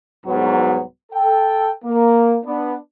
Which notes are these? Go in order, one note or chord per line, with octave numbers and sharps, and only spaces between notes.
C2 G#2 F#3 B3
A4 G5
A#3
B3 D4